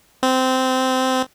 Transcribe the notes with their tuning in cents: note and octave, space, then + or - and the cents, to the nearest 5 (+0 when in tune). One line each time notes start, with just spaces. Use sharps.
C4 -15